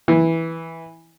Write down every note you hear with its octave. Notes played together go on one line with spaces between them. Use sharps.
E3